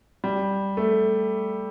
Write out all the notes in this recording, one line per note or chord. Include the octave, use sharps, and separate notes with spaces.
G3
A3